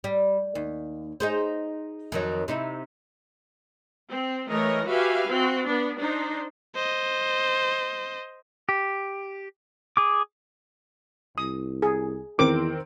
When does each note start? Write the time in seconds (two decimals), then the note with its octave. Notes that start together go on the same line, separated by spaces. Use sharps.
0.04 G3
0.55 D#2
1.20 D#4 G#4 C5
2.12 F2 D#3 F#3
2.48 C3 D#4 E4
4.08 C4
4.49 E3 A3 A#4 C#5 D#5
4.86 F#4 G4 B4 E5 F5 G#5
5.28 C4 F#4
5.65 B3 D4
5.98 D4 D#4 C5
6.75 C5 D#5
8.69 G4
9.97 G#4 D6
11.38 C2 D#6
11.82 G#4
12.39 E2 D#3 C4 D6 D7